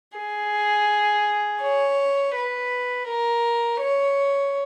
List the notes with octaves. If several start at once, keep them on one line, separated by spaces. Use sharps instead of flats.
G#4
C#5
B4
A#4
C#5